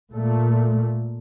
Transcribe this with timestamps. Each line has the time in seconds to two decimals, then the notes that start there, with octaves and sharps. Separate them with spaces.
0.13 A#2 A3